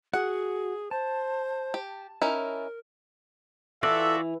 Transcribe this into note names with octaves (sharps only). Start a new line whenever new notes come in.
F#4 G#4 F#5
C5 A5
G4
C#4 D#4 E4 A#4
E3 F4 F#4 A4 D5 E5